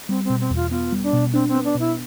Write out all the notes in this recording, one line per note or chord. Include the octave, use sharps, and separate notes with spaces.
G3 C4
C4
B2
C4
E2
F4
B3 F4
G3
D4
B2
C4 D4
C4
B3
D4
B2 E4